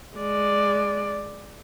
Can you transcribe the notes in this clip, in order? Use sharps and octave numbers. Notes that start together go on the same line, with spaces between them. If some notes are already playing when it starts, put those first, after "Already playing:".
G#3 D5